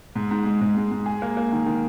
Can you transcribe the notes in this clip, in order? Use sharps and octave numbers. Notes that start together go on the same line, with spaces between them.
G#2
G#2
G#3
G#2
G#3
G#2
G#4
A#3
A#3
D#3
D#3